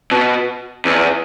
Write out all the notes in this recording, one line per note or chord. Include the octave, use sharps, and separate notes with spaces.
B2
E2